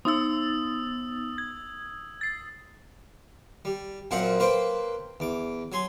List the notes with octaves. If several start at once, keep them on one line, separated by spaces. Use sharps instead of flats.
B3 D#4 D#6 E6 A6
G#6
A6 C7
G3
F#2 A#2 F3 C4 C5 F#5
A#3 B4 C5 G5
E2 D6
F#3 G#5 C6